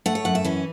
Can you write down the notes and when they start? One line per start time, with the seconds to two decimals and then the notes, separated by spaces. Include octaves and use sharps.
0.06 A3 F#5
0.15 C#5
0.25 F#2 F#5
0.35 E5
0.44 E3 C#4